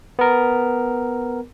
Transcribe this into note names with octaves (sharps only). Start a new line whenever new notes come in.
B3 A#4